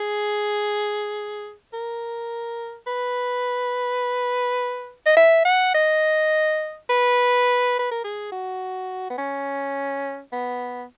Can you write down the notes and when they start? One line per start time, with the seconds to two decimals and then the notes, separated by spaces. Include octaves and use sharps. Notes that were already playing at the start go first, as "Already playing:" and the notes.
Already playing: G#4
1.73 A#4
2.87 B4
5.06 D#5
5.17 E5
5.45 F#5
5.75 D#5
6.90 B4
7.79 B4
7.91 A#4
8.04 G#4
8.32 F#4
9.10 B3
9.18 C#4
10.33 B3